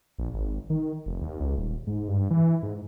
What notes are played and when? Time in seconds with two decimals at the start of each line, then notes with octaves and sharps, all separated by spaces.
0.18 A#1
0.34 G#1
0.70 D#3
1.06 F1
1.21 D#2
1.40 C#2
1.58 D#1
1.87 G#2
2.08 G2
2.31 E3
2.63 G#2